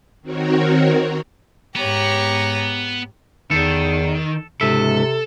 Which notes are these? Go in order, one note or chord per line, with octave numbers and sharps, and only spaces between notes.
D#3 C4 F#4 A#4 C#5
G#2 B3 G4 C#5 A#5
E2 D#3 A4
C#2 G#2 C3 A4 E5